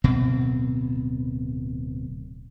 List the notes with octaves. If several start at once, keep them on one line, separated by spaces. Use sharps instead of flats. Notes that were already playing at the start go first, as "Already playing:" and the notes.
D1 B2 C4